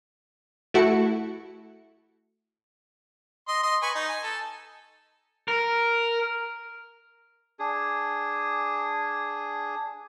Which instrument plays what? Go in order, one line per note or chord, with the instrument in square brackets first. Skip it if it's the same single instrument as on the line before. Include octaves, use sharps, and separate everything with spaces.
[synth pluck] A3 E4 F#4 A4 C#7
[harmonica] D#5 C6
D#5 C6
B4 G#5 C#6
D#4
G#5
A4
[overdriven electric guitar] A#4
[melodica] D4 G#4